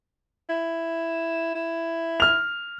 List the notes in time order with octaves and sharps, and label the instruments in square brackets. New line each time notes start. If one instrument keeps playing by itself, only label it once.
[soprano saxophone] E4
E4
[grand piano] F6 F7